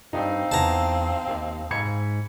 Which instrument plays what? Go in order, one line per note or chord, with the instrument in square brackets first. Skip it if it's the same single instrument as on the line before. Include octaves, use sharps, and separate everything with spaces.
[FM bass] G2 [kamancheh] C4 F5 [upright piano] D#4
[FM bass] E2 [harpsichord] A5 A#5
[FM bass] D#2
[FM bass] G#2 [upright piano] B5 G#6 C#7